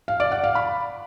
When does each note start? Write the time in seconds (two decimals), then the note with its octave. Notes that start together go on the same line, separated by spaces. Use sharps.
0.08 F5
0.20 D5
0.32 F#5
0.44 F5
0.55 B5